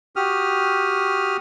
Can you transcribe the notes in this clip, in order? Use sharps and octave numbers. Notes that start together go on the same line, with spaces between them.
F#4 G4 D#6 F6